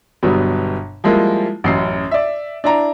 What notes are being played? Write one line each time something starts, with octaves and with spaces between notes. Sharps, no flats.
G1 B2 F#3 G3 B3
F3 G3 G#3 A#3 E4
A1 F#2 C7
D5 E5
D4 E4 D5 A#5